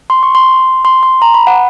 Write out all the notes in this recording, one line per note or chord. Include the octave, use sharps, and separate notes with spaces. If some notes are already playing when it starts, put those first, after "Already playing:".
C6
C#6
C6
C6
C6
A#5
B5
F#5